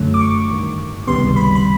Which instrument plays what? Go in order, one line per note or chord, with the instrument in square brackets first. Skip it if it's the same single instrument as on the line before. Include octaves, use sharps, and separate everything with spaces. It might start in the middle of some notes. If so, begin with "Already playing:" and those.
Already playing: [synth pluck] F#2 D3 F#3 A3
D6
C#6
A1 G2 D#3
C#2 C3 D#3 G3 B3 C6
B5
B5